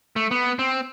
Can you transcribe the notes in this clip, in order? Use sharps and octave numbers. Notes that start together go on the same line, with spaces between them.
A3
B3
C4